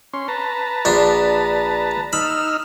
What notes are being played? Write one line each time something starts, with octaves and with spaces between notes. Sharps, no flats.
C#4 C6
B4 A5 A#5
A#1 D4
D#4 B5 E6 F6